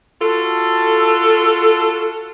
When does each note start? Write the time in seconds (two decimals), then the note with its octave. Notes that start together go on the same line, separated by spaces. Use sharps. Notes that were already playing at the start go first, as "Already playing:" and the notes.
0.22 F4 F#4 A4